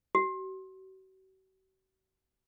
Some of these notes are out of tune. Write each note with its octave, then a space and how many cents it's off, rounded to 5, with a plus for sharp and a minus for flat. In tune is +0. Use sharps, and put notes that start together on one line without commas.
F#4 +45